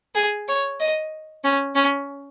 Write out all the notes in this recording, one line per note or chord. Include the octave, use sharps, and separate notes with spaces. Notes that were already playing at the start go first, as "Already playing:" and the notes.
G#4
C#5
D#5
C#4
C#4